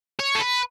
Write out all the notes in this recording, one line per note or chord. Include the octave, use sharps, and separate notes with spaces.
C#5
A4
B4